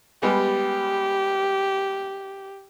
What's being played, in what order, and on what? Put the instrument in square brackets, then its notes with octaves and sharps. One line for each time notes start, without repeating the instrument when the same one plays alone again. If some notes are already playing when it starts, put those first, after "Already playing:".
[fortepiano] G3 G#3 B3 [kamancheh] G4